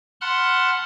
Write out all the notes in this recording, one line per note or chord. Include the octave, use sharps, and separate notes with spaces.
F#5 A5 B5 C6 F6 F#6